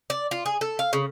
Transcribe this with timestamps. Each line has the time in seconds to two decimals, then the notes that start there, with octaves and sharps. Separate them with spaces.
0.10 D5
0.31 F4
0.46 G#4
0.61 A4
0.79 F5
0.93 C#3